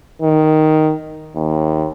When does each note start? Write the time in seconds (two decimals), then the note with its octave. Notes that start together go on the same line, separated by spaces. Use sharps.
0.22 D#3
1.36 D#2